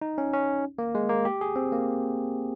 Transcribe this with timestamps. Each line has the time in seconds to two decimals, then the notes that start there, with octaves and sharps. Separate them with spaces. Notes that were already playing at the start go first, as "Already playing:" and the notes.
0.02 D#4
0.18 C#4
0.34 C#4
0.79 A#3
0.95 G#3
1.09 A#3
1.25 G4
1.41 G#4
1.56 C4
1.72 A#3